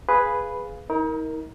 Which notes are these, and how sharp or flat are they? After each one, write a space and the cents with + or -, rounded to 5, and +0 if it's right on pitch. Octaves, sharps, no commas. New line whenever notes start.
G#4 +0 B4 +0 F5 +0
D#4 +40 A#4 +0